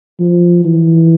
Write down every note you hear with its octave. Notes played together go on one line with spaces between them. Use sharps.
F3
E3